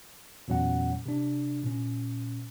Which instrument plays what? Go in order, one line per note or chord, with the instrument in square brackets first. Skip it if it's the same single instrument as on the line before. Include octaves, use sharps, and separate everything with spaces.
[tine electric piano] E2 A#2 F#3 C#4 F#5
C3 D4
A#2 C#4